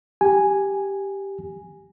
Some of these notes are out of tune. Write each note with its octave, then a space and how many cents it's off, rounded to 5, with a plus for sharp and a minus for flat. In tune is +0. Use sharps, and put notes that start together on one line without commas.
G4 +0 G#5 +0